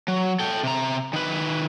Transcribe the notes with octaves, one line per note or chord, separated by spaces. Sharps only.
F#3
A4 G5
C3 A#5
D#3 B4